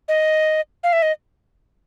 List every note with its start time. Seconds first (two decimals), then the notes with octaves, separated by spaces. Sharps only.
0.08 D#5
0.83 F5
0.93 E5
1.02 D#5